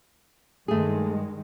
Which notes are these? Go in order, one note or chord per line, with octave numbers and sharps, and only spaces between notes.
G2 D#3 G#3 A3 G#4